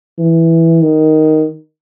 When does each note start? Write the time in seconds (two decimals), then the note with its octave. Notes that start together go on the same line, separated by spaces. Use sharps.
0.19 E3
0.82 D#3